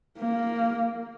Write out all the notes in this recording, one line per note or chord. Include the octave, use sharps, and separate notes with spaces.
A#3